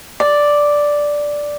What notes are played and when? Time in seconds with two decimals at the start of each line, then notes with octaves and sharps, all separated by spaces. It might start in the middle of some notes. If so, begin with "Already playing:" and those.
0.20 D5